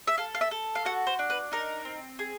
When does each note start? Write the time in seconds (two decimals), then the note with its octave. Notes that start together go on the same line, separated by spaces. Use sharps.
0.07 E5
0.18 A4 F5
0.35 F5
0.41 E5
0.51 A4
0.75 F5
0.85 F#4 F#5
1.07 C5
1.19 D4
1.30 B4
1.52 D#4 A#4
1.85 C4
2.19 G#4